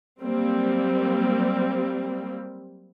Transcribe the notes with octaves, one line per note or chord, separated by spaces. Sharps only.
F#3 G3 A#3 C4